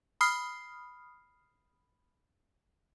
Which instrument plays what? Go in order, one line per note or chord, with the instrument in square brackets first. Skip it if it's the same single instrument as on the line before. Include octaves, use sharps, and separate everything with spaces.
[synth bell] B5 D#6 F6 C7